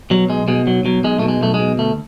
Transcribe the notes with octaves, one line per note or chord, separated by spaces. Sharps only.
B2 F#3
B1 G#3
B2 G#3
B1 F#3
B2 F#3
B1 G#3
B2 A3
G#3
B1 A3
G#3
B2
D2 A3